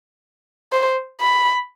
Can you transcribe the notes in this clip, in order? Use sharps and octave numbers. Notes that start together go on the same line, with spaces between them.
C5
B5